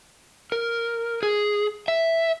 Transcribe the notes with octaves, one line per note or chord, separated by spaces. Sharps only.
A#4
G#4
E5